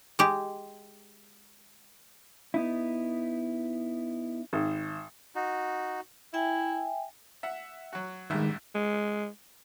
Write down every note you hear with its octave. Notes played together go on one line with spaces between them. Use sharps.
G#3 G4
B3 D#4 E4
G#1
D#4 F#4
E4 E5 G5 G#5
E5 F#5
F#3 F#4
A1 G2 D#3 G#3 E5
G#3